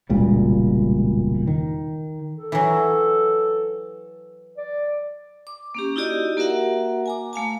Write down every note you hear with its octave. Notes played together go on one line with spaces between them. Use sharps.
E1 C#2 A#2 G3
D#3
A4
E3 F#3
D5
D6
A#3 C#4 G4
D#4 E4 F#4 G4 D5 D#5
A#3 F#4 A#4 E5 F#5
G#5 A#5 D6
A3 F5 G#5 A5